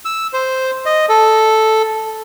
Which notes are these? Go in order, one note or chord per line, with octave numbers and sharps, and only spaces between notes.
E6
C5
D#5
A4